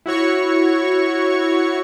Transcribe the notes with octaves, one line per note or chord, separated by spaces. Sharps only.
E4 F#4 C#5 C#6